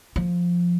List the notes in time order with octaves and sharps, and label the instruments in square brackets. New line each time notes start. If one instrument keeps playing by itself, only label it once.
[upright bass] F3